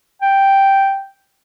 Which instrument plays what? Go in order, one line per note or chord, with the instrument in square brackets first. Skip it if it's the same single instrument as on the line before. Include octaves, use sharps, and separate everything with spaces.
[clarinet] G5